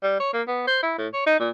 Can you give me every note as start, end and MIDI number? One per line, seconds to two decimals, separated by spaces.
0.03 0.19 55
0.20 0.31 73
0.34 0.42 58
0.48 0.66 59
0.67 0.79 72
0.83 0.94 64
0.98 1.08 45
1.13 1.23 73
1.26 1.39 63
1.40 1.50 46